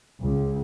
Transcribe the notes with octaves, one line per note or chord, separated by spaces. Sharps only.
C#2